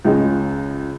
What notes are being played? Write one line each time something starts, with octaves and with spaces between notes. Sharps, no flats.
C#2 C#3 G#3